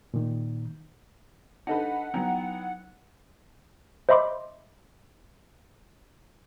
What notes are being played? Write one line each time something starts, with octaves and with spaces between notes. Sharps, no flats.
A#2 D#3
D4 D#4 A4 B4 C5 D#5 F#5
F#3 B3 D#4 E4 G5
C5 D#5 E5 B5 C6 D6